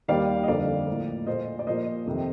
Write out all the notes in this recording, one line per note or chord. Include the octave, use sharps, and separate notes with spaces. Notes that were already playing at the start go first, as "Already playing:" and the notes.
D#2 D#3 G3 A#3 D5 F5
D#5
F2 D3 G3 A#3 D5 F5
A2 F3 A#3
A#2 A3 C5 D#5
D5
A#2 F3 A#3 C5 D#5
F2 C3 D#3